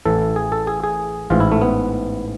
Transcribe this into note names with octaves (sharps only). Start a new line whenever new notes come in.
A1 A2 E3 A4
G#4
A4
G#4
G#4
A1 G#2 E3 F4
E4
A3
B3